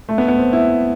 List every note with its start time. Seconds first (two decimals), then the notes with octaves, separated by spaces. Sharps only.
0.09 A3
0.18 B3
0.28 B3
0.38 C4
0.53 E4